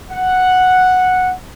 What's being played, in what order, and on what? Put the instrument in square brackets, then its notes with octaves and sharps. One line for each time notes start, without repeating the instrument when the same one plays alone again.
[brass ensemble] F#5